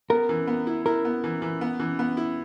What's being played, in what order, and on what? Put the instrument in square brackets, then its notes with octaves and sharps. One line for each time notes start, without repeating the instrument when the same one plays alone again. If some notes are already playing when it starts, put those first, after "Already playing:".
[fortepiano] B3 [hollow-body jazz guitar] A#4
[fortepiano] E3
B3
E4
[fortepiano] E4 [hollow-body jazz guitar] A#4
[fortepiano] B3
E3
E3
B3
E3
B3
E4